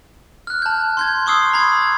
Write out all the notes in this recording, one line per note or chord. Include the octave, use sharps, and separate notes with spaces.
F6 F#6
A5 G6
C6 G6 G#6
C6 C#6 D#6 E6 C7
A#5 B5 G#6